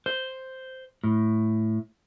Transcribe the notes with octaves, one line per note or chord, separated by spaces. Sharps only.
C5
A2